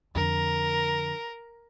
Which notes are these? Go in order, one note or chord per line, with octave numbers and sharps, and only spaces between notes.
F2 D3 A#4